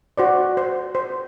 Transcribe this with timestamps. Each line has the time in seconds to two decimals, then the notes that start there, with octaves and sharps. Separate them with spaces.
0.18 F#4 C5 D5
0.57 C5
0.95 C5